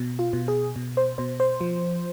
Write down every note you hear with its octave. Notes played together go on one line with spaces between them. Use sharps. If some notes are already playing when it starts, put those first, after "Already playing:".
Already playing: B2
F4
B2
G#4
B2
C5
B2 C5
C5
F3